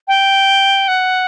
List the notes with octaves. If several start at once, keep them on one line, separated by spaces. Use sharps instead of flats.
G5
F#5